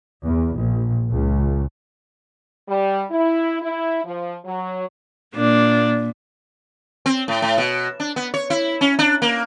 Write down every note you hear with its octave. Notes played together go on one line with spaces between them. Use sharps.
E2
A#1
C#2
G3
E4
E4
F3
F#3
A#2 A#3 D4
C4
A2
A2
B2
D4
B3
C#5
E4
C#4
D4
A#3